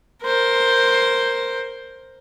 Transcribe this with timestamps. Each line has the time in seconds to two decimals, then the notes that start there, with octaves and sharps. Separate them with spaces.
0.24 A#4 C5